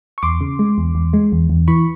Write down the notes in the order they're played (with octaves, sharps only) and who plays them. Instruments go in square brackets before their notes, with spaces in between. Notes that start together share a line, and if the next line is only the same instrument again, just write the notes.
[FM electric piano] C#6
E2 C6 D6
C#3
G#3
E2
E2
G#3
E2
E2
E3 B5 C#6